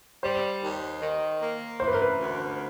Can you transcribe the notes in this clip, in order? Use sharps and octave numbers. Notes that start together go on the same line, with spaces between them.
G3 C5
D#2
D#3
A#3
E3 C5
B4
A#4
B4
D2